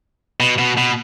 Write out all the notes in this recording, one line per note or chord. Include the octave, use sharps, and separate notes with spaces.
B2
B2
B2